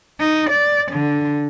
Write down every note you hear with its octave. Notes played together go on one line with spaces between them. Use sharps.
D#4
D5
D3